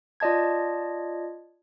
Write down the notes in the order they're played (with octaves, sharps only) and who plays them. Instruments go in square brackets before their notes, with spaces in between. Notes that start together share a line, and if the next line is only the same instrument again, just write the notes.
[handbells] F4 D5 D#5 A5 G#6